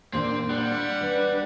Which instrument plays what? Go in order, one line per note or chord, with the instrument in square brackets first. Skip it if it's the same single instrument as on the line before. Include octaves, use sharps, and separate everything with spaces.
[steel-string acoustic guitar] A#2 A#3 D4 [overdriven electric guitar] C4
[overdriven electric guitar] G3 [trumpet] F#5
[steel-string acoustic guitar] D4 [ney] B4